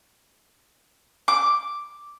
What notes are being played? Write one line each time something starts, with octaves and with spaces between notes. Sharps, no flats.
D6